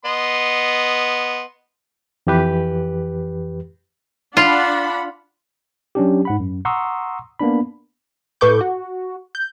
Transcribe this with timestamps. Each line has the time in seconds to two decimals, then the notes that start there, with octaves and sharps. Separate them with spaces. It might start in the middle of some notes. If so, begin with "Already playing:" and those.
0.05 B3 D#5 C6
2.27 F2 E3 G4 B4
4.37 D4 F4 F#5 B5
5.95 F#3 C#4 D4 G4
6.25 G#2 F#5 B5
6.40 F#2
6.65 F#5 A#5 C6 C#6 D#6 E6
7.39 A#3 B3 D4 B5
8.41 A2 A4 B4 C#6 D6 G6
8.61 F#4
9.35 G6